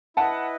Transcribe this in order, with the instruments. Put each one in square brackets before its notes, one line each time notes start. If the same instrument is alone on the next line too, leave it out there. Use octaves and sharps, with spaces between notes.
[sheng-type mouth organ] E4 B4 D#5 [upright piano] F#5 A5